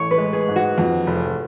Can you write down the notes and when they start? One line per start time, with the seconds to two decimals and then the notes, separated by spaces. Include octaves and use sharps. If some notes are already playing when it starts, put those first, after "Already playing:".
Already playing: A1 A4 C#5
0.11 B4
0.18 G#3
0.33 G#4
0.48 G#2
0.56 F#4
0.78 F2
1.07 F1